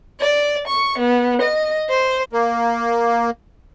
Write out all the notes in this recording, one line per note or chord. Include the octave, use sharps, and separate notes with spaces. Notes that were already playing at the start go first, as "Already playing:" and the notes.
D5
C#6
B3
D#5
C5
A#3